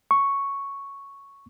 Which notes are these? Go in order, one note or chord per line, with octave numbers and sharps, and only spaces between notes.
C#6